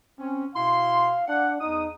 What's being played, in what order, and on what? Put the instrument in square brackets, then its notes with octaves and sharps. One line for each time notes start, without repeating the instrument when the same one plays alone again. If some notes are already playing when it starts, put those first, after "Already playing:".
[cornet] C4 [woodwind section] C#4
[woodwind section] B2 E4 C6 [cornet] F5
[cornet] D4 [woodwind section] D5 F#5
[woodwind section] E2 D#6 [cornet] D#4